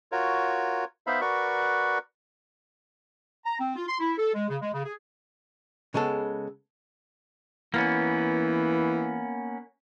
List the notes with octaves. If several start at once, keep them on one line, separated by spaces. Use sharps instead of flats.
F4 F#4 A#4 C#5
B3 D#4 C5 E5 F5 B5
F#4 A#4 B4 D5 C#6
A#5
C4
F4
C6
E4
A4
G#3
C#3
G#3
C#3
G#4
C#3 G#3 B3 A4
E3 A#3 B3 C#4